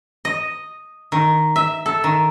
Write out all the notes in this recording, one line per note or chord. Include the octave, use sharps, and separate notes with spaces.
D#5
D#3
E5
A4
D#3